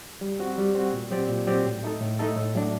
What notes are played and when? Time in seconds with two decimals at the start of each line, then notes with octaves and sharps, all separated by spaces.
0.21 G3
0.40 C4 F#4
0.58 G3
0.75 C4 F#4
0.93 A#2
1.11 F#3 C4 G4 D5
1.29 A#2
1.47 F#3 C4 G4 D5
1.64 A2
1.83 A3 D#4 A4
2.01 A2
2.19 A3 D#4 A4
2.36 A2
2.55 F#3 A3 D4